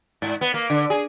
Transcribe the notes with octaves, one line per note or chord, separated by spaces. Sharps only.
G#2
B3
A#3
D3
G#4